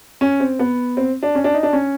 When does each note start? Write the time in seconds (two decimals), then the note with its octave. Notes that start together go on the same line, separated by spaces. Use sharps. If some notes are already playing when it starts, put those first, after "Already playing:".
0.21 C#4
0.40 C4
0.59 B3
0.97 C4
1.23 D4
1.35 C#4
1.44 D4
1.54 D#4
1.63 D4
1.73 C#4